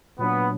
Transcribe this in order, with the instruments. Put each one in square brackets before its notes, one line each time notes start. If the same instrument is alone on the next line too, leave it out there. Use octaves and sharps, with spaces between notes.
[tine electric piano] A#2 F#3 A#3 D4 [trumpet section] B3